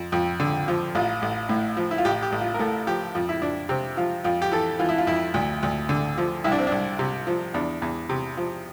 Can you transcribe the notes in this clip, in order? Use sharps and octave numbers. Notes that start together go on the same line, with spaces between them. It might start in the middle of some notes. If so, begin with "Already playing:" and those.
Already playing: F2
F2
D3
F3
A1 F4
A1
A2
F3
E4
F4
A1 G4
G4
A1
F4
A#4
A2 A4
F3 G4
F2 F4
E4
F2 D4
C3 C4
F3 F4
F2 F4
G4
E3 A4
E3 F4
E4
F4
F2 E4
D2
D2
D3
F3
C2 E4
D4
C4
C2 D4
C3
F3
E2 D4
E2
C3
F3